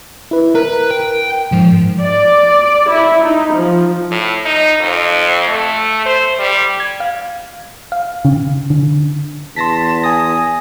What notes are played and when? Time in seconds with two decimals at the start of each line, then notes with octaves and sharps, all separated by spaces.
0.31 E4 B4
0.55 A#4 B4
0.91 G5
1.52 G#2 F3
2.02 D5
2.89 E4
3.22 D#4
3.54 F3
4.11 A2
4.45 D#4
4.80 F2
5.48 A3
6.05 C5
6.39 G3
6.80 G#6
7.00 F5
7.92 F5
8.25 C#3
8.70 D3
9.56 E2 A5 C6 A#6 B6
10.03 G#5 D#6 A#6